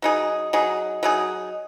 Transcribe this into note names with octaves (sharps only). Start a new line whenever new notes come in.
F#3 D#4 G#4
F#3 D#4 G#4
F#3 D#4 G#4